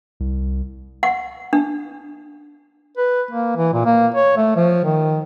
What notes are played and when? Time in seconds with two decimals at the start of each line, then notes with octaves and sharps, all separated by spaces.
0.20 C2
1.03 F#5
1.53 D4
2.97 B4
3.31 A#3
3.56 E3
3.73 A#2
3.85 A#3
4.14 C#5
4.37 A3
4.56 F3
4.84 D#3